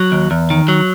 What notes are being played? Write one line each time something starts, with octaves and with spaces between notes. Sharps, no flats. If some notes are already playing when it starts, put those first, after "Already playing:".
Already playing: F#3
D#2
E2
D#3
F#3